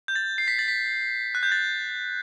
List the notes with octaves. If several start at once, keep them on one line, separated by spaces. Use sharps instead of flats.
G6
A6
C7
B6
A6
B6
F#6
G6
A6